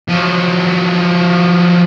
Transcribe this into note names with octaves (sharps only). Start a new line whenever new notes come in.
F3 F#3